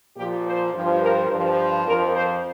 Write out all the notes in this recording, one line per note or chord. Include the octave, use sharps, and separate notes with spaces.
A#2 F3 G4
C5
G2 F3
A#4
G2 F3 C5
F2 F3 A#4
C5